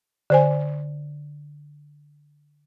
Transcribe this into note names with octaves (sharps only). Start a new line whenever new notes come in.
D3 C5 G#5